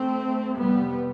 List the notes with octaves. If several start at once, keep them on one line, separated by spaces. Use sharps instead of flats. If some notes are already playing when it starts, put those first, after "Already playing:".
Already playing: A3 C4
F2 C3 G3 B3